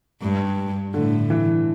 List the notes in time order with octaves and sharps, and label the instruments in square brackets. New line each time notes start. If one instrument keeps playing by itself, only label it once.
[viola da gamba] G2
[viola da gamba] A2 [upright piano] D3
[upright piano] E3